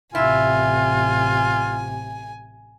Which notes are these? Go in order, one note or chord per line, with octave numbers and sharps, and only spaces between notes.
A1 C3 E4 F4 G#5